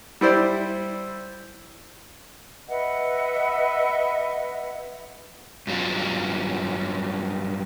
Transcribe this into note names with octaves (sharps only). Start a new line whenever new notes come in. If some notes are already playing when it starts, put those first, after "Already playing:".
G3 E4 C5 D5
B4 D#5 E5 F#5
G2 F#3 G3 C#4 F4